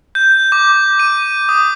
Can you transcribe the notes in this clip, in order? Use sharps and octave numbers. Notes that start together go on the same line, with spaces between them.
G6
D6
D#7
D#6